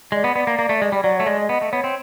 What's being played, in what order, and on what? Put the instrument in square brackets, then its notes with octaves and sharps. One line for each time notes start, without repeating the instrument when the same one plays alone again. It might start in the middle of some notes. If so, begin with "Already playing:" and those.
[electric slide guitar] G#3 [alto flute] D5
[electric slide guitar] B3
[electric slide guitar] B3 [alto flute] D5
[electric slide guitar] A#3
A#3
A3
G#3
G3
[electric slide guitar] F#3 [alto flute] D5
[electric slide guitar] A3 [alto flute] C#5
[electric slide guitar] G#3 [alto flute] D5
[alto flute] D#5
[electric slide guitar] B3 [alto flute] D#5
[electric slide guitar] A3
[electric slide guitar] B3 [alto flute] C#5
[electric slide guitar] C4